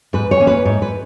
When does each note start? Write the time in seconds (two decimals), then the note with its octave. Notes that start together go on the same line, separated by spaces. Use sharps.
0.13 G#2 B4
0.31 C#5
0.40 E3 A#3 C#4
0.47 B4
0.65 G#2 C#5
0.82 B4